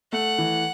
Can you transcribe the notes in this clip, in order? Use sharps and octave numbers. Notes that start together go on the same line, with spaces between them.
A3 F#5
E3